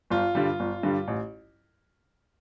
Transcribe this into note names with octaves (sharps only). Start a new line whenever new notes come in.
G1 F4
G2 D3 G3
G1
G2 D3 G3
A1